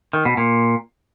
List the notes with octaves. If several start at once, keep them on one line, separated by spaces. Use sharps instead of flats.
D#3
B2
A#2